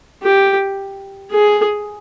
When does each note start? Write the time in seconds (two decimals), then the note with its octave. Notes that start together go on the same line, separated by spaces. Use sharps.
0.23 G4
1.31 G#4